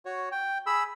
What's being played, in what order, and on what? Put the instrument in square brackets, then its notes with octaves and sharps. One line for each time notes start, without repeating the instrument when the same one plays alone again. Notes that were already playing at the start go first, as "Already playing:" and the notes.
[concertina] F#4 C#5
G5
G#4 B5 E6